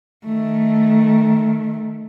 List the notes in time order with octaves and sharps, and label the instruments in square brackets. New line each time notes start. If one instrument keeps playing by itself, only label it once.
[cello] D#3 A3